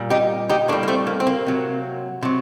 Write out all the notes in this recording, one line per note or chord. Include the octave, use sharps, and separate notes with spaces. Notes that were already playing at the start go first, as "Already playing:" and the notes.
Already playing: A#2 G3
D#4 G4
D#4 G4
A2 G3 A#3 D4
A#3
A3 C4
A#3
C4
A#3
C3 F#3
C3 F#3